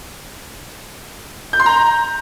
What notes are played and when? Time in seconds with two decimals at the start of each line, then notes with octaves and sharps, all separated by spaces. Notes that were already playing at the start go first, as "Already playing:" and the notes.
1.53 G6
1.60 C6
1.66 A#5